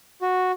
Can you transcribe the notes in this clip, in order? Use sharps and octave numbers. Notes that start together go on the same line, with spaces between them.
F#4